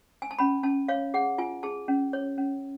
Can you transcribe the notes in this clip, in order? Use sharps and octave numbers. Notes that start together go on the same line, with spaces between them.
G#5
A5
C#4 B5
C#4 A5
C#5 F5
G#4 F#5
F4 G#5
G#4 A5
C#4
C#5
C#4